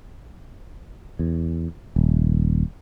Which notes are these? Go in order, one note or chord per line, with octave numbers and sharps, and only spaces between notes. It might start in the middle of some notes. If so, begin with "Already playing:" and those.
E2
D#1